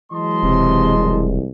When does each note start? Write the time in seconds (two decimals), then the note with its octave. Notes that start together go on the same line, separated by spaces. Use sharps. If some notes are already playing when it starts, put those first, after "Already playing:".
0.12 E3 F#3 G#3 D#5 A5 C6
0.43 E1 C3
0.98 C2